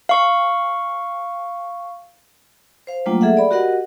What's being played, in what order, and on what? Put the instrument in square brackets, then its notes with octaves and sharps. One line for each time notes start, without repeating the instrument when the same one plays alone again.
[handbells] F5 C#6
[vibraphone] C5 F5
F#3 G3 A3 A#3 D4 F4
G#4 A4 E5 F#5
D5 B5
F#4 G4 A#4 D#5 F#5